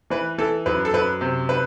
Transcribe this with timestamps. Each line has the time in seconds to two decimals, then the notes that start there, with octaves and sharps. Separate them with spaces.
0.10 E3 B4
0.38 E3 A4
0.66 F#2 B4
0.85 A4
0.93 F#2 B4
1.21 C3
1.49 B4